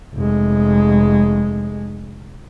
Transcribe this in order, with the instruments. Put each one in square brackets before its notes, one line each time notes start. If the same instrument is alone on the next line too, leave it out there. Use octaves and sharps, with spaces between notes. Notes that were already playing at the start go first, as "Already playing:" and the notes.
[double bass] F1 G#3